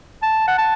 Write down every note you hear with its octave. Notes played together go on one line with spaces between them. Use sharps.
A5
F#5
A5